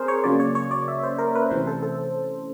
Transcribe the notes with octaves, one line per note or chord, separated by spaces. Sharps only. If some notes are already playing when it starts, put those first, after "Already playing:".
Already playing: C4 G#4 A#4 C5
C#5
C#3 F#3 A#3 C#4 D5
C#5
C#5
D5
E5
C5
A#4
B4
C3 E3 A3 C#4 C5
A4
A4